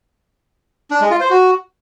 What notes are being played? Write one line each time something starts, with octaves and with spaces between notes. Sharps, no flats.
D4
G#3
F4
C5
F#4